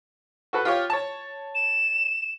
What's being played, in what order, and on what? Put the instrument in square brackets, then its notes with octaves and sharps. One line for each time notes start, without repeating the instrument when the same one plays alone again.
[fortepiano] F#4 A4 B4
F4 G4 C#5
C#5 A5
[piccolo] E7